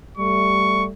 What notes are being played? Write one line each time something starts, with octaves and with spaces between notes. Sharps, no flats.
G3 A3 C#6